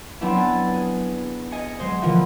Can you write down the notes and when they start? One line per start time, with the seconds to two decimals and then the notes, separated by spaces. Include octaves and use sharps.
0.21 F#3 B3 C4 D4 E4
0.37 G#5 F#6 A6
0.74 G#4
1.51 D#5 G#5 A#6 C#7
1.79 F#3 G#3 C5 D#5
2.02 B2 D3 E3 F3 A#3 B3